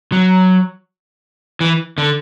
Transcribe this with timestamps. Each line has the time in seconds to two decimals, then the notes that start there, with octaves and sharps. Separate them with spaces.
0.12 F#3
1.60 E3
1.98 D3